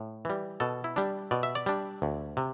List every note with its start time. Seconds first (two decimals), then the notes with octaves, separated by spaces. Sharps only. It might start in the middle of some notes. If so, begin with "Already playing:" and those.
Already playing: A2
0.25 E3 G3
0.60 B2 A4
0.84 E4
0.96 G3 D4
1.31 B2 D5
1.43 E5
1.55 D5
1.66 G3 D4
2.02 D2
2.37 C3